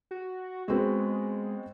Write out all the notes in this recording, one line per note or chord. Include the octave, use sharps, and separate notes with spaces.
F#4
G#3 B3 C4 F#4